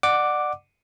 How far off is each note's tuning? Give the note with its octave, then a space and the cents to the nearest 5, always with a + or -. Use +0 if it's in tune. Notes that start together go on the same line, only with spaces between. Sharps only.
D5 +30 F#5 +0 D6 +0